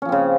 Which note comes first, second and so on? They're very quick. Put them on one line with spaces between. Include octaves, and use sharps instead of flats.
C#4 F3 C4 C#3